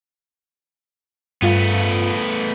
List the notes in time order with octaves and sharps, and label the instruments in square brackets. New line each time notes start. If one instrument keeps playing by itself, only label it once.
[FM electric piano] G2 F4 F5 [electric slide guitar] A3 B3